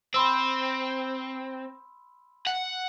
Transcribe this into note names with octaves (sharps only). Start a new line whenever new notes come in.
C4 B5 C6 E6
F#5